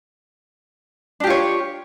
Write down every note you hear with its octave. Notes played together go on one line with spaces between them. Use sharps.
D4 F4 G4 C#5